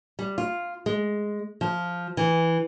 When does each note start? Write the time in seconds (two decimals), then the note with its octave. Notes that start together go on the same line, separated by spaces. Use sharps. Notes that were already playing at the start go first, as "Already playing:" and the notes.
0.19 G3
0.38 F4
0.86 G#3
1.61 F3
2.17 E3